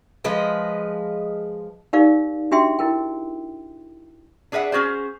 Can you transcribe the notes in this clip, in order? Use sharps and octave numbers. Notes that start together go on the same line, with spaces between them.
F3 G#3 B4 D#5
D#4 G4 A#4 D5 F5
D4 F#4 G4 E5 G5 C6
E4 A#4 G5
D4 G#4 B4 E5 F#5
C#4 F#4 G#4 C5